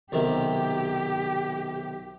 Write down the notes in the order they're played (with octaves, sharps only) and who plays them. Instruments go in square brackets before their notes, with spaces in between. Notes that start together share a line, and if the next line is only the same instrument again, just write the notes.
[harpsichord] B1 C3 D#3 [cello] G4